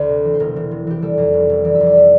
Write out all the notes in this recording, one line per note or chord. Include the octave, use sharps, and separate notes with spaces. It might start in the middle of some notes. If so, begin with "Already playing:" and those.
Already playing: D2 C5 D5
C3
E3
C5
E1 A#4
E3
C3
E3 G4
G3 A4
F2
F1
F1
E3 D5
E5
F2
D5
E5